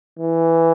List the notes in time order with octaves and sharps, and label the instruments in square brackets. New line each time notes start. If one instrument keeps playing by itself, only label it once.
[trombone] E3